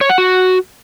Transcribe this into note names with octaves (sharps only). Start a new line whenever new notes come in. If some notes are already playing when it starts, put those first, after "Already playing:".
C#5
F#5
F#4